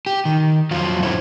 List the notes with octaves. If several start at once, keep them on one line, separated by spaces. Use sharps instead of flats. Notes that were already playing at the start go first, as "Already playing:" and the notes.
G4
D#3
F2 F#3 F4 F5
F2 D3 E4 C5 C#5